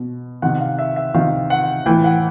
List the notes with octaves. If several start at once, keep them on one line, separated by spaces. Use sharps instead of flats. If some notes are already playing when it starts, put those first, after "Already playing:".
Already playing: B2
C3 D#3 F#5
F5
E5
E5
C3 D#3 F5
F#5
A2 E3 G5
F#5